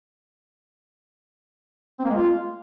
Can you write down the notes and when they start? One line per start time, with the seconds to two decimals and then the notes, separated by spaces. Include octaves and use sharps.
1.99 C4
2.04 A#3
2.10 G#3
2.15 F4